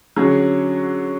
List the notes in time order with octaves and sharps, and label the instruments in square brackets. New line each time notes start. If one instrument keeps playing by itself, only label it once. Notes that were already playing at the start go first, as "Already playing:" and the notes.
[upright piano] D3 F#3 C#4 G#4 C#5